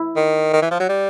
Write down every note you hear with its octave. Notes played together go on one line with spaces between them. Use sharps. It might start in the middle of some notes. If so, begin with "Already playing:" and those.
Already playing: E4
D#3
D#3
E3
F3
F#3
G3